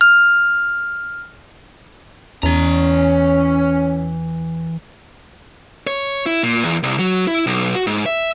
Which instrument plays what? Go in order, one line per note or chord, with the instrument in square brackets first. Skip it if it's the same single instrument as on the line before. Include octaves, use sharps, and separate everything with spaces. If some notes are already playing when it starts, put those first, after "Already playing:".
[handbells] F6
[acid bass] E2 [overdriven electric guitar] E3 A#5 [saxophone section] C#4
[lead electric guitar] C#5
E4
A#2
E2
C2
F#3
E4
B1
F#4
G#2
E5